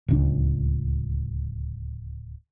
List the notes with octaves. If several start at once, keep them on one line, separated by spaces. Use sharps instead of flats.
D1 C#2 D4